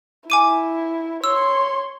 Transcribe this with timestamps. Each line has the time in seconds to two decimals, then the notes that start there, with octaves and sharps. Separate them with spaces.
0.30 E4 G#5 D6 D#7
1.24 C#5 C6 E6